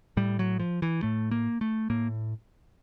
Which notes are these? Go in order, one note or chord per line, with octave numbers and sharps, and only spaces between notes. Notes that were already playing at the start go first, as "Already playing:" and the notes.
A2 G3
F#3
F3
E3
A2 A3
A#3
A3
A2 A#3